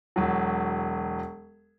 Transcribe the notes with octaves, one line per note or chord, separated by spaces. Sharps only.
E1 F#3